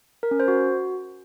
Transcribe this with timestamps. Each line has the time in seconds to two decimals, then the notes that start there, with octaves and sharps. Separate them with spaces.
0.23 A#4
0.31 C#4
0.40 C5
0.48 F#4